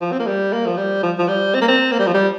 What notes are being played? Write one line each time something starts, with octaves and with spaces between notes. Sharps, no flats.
F3
C4
A#3
G3
A#3
F3
G3
F3
F3
G3
C4
A#3
C4
A#3
G3
F3
G3